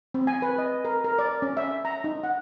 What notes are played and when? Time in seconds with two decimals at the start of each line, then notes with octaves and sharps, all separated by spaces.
0.14 C4
0.27 G#5
0.42 B4
0.58 D#5
0.85 A#4
1.04 A#4
1.19 D5
1.42 C#4
1.57 E5
1.85 A#5
2.04 D#4
2.23 F#5